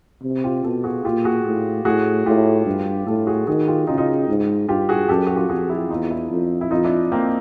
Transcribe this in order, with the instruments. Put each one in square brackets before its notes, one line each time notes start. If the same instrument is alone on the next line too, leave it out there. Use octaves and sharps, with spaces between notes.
[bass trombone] C3
[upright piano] F4 G4
[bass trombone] B2 [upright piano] G4 A4
[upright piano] F#4 G#4
[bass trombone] A#2 [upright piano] F4 G4
[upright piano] F#4 G#4
[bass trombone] A2
[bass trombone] A2 [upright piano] F#4 G#4
[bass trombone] A2 [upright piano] F4 G4
[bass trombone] G2
[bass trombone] A2 [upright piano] G4 A4
[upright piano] F#4 G#4
[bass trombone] D#3 [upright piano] F#4 G#4
[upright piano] F4 G4
[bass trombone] C#3 [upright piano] D#4 F4
[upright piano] D#4 F4
[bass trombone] G#2
[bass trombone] G2 [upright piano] F4 G4
[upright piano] F#4 G#4
[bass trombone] F#2 [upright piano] G4 A4
[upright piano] F#4
F4 G4
[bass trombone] F2 [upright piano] F#4 G#4
[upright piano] E4 F#4
[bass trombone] E2 [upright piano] D#4 F4
[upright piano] D4 E4
[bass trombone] F2
[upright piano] E4
[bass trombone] F2 [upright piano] D#4 F4
[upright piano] D4 E4
A#3 C4